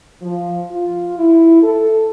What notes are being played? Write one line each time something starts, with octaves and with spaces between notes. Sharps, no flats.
F3
F4
E4
A4